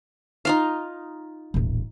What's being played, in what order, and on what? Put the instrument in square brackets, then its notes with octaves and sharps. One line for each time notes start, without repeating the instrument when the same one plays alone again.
[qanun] D#4 F4 F5
[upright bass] D#1 A1